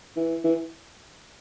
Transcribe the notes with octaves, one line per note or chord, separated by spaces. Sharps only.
E3
E3